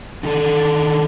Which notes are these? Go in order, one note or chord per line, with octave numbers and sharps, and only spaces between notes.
D3 D#3 A4